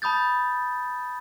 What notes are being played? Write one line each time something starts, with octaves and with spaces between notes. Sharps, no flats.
A5 B5 D#6 G6 A6